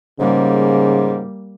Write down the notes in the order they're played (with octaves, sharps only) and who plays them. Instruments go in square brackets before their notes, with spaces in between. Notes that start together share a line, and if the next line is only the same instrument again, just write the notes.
[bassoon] G#2 [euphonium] C#3 [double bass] G3 A#3